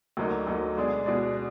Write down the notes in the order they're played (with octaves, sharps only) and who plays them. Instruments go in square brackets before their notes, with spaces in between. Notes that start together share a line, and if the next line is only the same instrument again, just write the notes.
[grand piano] D2 D3 F#3 A#3 D#4
D2 D3 F#3 A#3 D#4
B2 G#3 D4 G#4 D5
B2 G#3 D4 G#4 D5